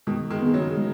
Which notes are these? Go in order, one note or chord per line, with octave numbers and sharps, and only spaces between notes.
B2 D#3 G#3
D#3 G#3
B3 G#4
C#3 F#3
G#3